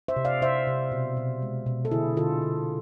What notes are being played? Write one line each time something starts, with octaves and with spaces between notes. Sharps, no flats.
C5 E5
C3
D5 F5
C3 C5 E5
C3
B2
B2
G#3
B2
A4
D3 E4 G#4
D3 F4 A4
D3